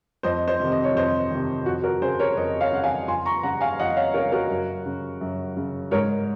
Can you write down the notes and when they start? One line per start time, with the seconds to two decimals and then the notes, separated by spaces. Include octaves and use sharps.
0.23 F2 C5 D#5
0.48 C5 D#5
0.60 C3 D#3
0.72 D#5
0.84 C#5
0.94 F2 C5 D#5
1.30 C3 D#3
1.66 F2 F#4
1.84 F#4 A#4
2.02 C#3 G#4 C5
2.19 A#4 C#5
2.37 F2 C5 D#5
2.61 C#5 F5
2.72 C#3 F#5
2.84 F5 G#5
3.08 F2 G#5 C6
3.25 A#5 C#6
3.43 C#3 F#5 A#5
3.61 F5 G#5
3.79 F2 D#5 F#5
3.96 C#5 F5
4.14 C#3 A#4 C#5
4.32 F#4 A#4
4.50 F#2
4.86 C#3
5.21 F#2
5.56 C#3
5.91 G#2 A#4 C#5